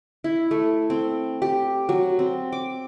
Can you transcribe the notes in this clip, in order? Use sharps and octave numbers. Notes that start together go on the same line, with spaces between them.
E4
A3
C4
G4
F#3
C4
D6